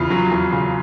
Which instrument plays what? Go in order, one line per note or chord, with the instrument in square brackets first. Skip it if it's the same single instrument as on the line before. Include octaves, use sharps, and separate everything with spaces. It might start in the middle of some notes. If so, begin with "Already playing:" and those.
Already playing: [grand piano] E2 C#3 F4
F#3
E2
C#3